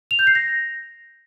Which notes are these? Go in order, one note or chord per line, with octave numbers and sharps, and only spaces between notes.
F7
G6
C7
A#6